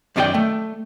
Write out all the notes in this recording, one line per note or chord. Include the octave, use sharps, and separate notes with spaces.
F#2 D#3 D4 G#4 D5 G5
A3